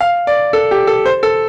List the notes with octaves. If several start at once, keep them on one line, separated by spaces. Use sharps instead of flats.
F5
D5
A4
G4
A4
C5
A4